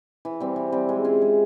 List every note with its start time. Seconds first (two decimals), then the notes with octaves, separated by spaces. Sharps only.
0.25 E3
0.41 G3 C4
0.56 E3
0.72 G3 C4
0.89 G#3
1.05 C#4 F4 G#4
1.22 G#3